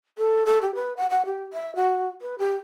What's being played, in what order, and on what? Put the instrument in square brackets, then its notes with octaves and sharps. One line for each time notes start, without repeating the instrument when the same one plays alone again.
[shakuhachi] A4
A4
G4
B4
F#5
F#5
G4
E5
F#4
B4
G4